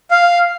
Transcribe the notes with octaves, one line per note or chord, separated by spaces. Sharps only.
F5